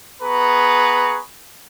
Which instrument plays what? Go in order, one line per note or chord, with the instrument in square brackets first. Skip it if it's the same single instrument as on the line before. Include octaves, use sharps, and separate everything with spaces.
[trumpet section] B3 G#4 B4 A#5 C#6